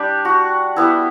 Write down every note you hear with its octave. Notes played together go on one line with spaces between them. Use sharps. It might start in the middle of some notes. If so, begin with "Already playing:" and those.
Already playing: G3 D4 G4
F#4
G3 B3 E4